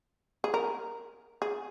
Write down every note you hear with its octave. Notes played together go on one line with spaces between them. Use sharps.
G#4
A#4
G#4